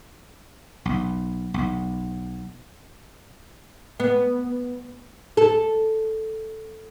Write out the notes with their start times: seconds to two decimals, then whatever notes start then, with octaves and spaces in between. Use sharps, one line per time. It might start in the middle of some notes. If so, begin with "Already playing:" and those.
0.85 B1
1.54 B1
4.00 B3
5.37 A4